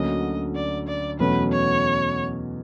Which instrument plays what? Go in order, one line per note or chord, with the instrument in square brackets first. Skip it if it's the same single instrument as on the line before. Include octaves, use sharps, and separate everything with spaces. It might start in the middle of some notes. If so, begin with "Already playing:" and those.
Already playing: [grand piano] D2 D3 F#3 A#3 C#4 [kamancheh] D#5
[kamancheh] D5
D5
[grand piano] E2 B2 F#3 A3 C#4 [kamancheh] B4
[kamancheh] C#5